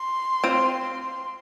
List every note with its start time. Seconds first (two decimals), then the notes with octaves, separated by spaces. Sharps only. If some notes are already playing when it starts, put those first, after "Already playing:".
Already playing: C6
0.44 C4 F4 C5